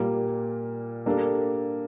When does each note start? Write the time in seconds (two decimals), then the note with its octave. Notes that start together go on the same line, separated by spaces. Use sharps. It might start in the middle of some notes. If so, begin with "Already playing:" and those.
Already playing: A#2 G3 A#3
1.06 G3 A#3 D4 A4